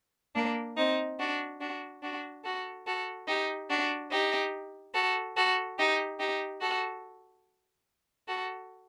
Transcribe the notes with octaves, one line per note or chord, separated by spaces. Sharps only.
A#3 D4
C4 D#4
D4 F#4
D4 F#4
D4 F#4
F#4 A4
F#4 A4
D#4 G4
D4 F#4
D#4 G4
F#4 A4
F#4 A4
D#4 G4
D#4 G4
F#4 A4
F#4 A4